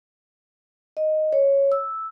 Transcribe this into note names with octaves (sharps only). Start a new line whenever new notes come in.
D#5
C#5
E6